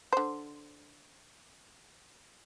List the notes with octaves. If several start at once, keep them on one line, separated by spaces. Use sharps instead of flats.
D3 C5